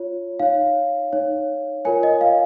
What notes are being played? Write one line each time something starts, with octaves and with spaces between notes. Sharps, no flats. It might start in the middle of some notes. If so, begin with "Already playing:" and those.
Already playing: F4 C#5
D#4 C#5 F5
D#4 C#5
F4 A#4 C#5 G#5
D#5
F5